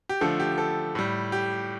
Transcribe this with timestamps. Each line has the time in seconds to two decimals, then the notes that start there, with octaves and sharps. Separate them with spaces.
0.09 G4
0.21 D3 F3 A3 A4
0.40 G4
0.58 A4
0.95 A2 G3
1.32 G4